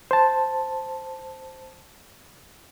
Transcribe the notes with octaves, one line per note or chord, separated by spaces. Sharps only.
C5 A5